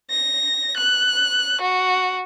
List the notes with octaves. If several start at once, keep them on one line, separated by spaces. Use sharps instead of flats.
A#6
F#6
F#4